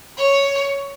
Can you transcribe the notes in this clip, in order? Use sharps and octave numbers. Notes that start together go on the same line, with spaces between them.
C#5